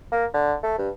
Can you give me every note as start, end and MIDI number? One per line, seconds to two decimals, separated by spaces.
0.12 0.25 58
0.34 0.55 50
0.64 0.77 57
0.78 0.89 43